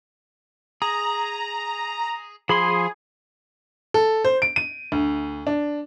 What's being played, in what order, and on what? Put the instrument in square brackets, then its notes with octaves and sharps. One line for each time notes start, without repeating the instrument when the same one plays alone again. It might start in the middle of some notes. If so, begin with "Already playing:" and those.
[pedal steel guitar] G#4 [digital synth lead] A#5
[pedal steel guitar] F3 B5 C6 [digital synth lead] G#4
[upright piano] A4
C5
D7
D#7
D2
D4